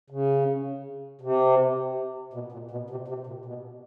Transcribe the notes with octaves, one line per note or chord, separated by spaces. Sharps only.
C#3
C3
B2
A#2
B2
C3
C3
A#2
B2